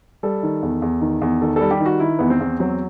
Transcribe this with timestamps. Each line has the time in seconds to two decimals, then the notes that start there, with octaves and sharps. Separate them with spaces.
0.23 G3 A4
0.43 D#3
0.63 E2
0.82 E2
1.01 D#3
1.22 E2
1.42 D#3 A4
1.56 G3 A4
1.71 G4
1.80 D#3
1.86 F#4
2.00 D#3 E4
2.19 E2 B3
2.30 C4
2.40 E2
2.60 F#3 C4